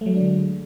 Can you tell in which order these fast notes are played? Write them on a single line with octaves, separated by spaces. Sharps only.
A3 F#3 G#3 D4 D3